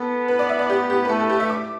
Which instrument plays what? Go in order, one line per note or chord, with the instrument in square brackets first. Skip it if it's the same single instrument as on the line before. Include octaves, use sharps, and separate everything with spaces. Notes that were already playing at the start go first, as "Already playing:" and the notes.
Already playing: [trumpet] B3 [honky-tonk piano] A4
[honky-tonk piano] B4
D5
E5
D5
G4
G4
B4
[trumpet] A3 [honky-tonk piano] A4
[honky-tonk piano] A4
G4
E5
D6